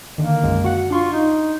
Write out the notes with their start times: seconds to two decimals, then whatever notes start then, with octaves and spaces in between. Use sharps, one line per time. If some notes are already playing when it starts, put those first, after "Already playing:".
0.18 D3 D#3 A#3
0.43 B1 F#2 G#3
0.64 F#4 F#5
0.90 D4 F4 C6 C#6
1.12 D#4